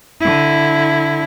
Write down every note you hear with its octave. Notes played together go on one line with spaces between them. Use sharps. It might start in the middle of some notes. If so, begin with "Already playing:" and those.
D3 E4